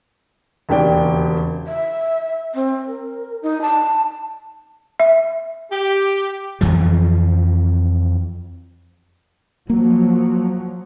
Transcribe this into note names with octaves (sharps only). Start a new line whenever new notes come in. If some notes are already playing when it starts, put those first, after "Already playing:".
E1 D#2 C#3 G4 D5 G5
E5
C4
A#4
D#4
A5
E5
G4
F2 E3 F3
F3 F#3 A#3